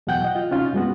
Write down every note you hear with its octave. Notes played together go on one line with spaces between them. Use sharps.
E2 B2 F#3 F#5 G5 G6
D#5
F4
C3 C#4 D#4 F4
G2 G3 G#3 B3 F#4